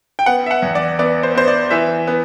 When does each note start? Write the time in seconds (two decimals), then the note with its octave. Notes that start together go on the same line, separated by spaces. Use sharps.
0.19 G5
0.26 B3 F#5
0.46 E5
0.51 F#5
0.62 E2
0.75 D5
0.99 B3 D5
1.23 C5
1.35 B3 C5
1.48 D5
1.71 E3 E5
2.07 B3